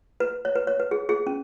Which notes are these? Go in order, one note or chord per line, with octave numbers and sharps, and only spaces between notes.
B4
C#5
B4
C#5
B4
G#4
G#4
C#4